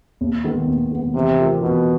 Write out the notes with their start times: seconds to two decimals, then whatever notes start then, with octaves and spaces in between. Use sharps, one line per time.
0.21 D#2
0.44 D#3 G#3 B3
0.67 D#2
0.91 D#3 G#3 B3
1.14 C3 E3
1.38 A3 C4 F4 A#4
1.61 B2 E3